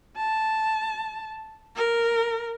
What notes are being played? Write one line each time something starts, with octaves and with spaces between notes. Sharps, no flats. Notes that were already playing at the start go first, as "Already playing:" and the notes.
A5
A#4